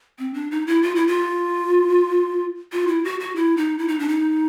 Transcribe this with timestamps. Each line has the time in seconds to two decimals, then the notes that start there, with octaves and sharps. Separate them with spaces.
0.19 C4
0.34 D4
0.51 D#4
0.67 E4
0.83 F4
0.95 E4
1.07 F4
2.72 F4
2.88 E4
3.04 F#4
3.20 F#4
3.36 E4
3.57 D#4
3.78 E4
3.88 D#4
3.99 D4
4.09 D#4